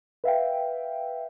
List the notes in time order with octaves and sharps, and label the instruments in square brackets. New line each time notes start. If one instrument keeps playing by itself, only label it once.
[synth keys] B4 E5 F5 G5